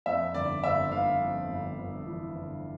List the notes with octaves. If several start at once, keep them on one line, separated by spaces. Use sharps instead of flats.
F2 E5
G1 D5
G1 E5
G1 F5
F2
G1
G1
E3
G1